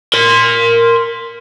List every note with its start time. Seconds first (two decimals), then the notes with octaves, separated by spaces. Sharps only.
0.14 A#4 C6